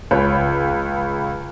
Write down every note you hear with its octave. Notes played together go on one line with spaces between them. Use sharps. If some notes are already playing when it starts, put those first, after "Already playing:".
C#2 B4 C#5